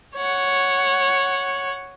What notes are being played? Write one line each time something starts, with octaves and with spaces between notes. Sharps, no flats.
C#5 F#5